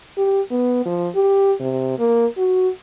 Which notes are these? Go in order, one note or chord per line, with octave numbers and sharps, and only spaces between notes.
G4
B3
F3
G4
C3
A#3
F#4